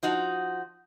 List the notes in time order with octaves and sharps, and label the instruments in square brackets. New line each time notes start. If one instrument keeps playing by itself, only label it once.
[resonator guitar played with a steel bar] F3 D#4 F#4